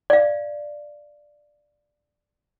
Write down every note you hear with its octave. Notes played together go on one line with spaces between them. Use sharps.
D5 F5